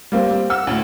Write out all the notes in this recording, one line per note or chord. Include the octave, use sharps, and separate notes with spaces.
G3 A#3 C4
F#5 E6
D2 A2